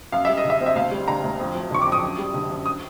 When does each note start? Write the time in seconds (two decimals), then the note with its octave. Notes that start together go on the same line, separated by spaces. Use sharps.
0.12 F#2 F5
0.25 G3 E5
0.37 D#5
0.44 D3
0.50 E5
0.60 C4
0.66 E5
0.75 D2 F5
0.91 G3
1.08 D3 A#5
1.24 D2
1.39 F2
1.55 F#3
1.71 D3 C#6
1.82 D6
1.86 F2
1.92 D#6
2.02 F#2
2.18 G3
2.34 D3
2.50 F#2
2.66 D#6